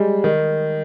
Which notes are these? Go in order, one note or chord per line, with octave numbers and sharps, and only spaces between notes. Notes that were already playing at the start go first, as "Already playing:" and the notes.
Already playing: G3 G#3
D#3